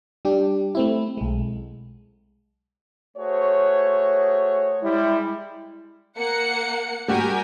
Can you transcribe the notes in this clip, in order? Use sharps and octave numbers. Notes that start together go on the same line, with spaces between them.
G3 D4 G4
A3 C4 E4
B1 G#3
A3 F#4 G#4 C5 C#5
G3 G#3 E4
A#3 F#5 C#7
G3 F#4 G4 A#4 G5 G#5